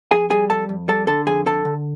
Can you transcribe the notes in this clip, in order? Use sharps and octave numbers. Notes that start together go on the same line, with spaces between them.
F2 G#4 G#5
G3 G#4 G#5
F2 A4 A5
F2
G3 A4 A5
D3 A4 A5
F2 G#4 G#5
D3 A4 A5
D3